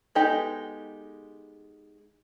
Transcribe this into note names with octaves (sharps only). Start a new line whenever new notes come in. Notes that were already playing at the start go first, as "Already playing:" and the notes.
G#3 B3 D#4 G4 A4